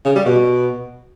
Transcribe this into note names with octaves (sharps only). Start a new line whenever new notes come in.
C#3
G3
B2